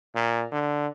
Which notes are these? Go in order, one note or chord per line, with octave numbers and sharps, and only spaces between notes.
A#2
D3